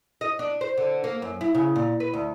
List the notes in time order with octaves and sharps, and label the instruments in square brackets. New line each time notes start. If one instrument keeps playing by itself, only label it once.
[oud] D#5
D4
C5
D3
A#3
F#2
E4
C#3
A#2
B4
D2